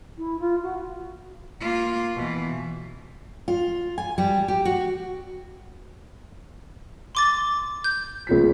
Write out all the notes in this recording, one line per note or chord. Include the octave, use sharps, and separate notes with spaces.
E4
F4
F#4
A#3 F4
B2 E3
F4
G#5
G3
G4
F#4
C6 D6 A6
G6
C#2 F3 B6